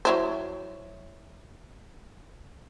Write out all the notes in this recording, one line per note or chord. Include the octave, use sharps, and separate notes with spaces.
F#3 E4 C5